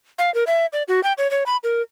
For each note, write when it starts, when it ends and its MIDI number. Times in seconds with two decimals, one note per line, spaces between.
0.18 0.33 77
0.34 0.44 70
0.47 0.66 76
0.73 0.83 74
0.88 1.03 66
1.03 1.13 79
1.18 1.30 73
1.31 1.44 73
1.46 1.57 83
1.64 1.82 70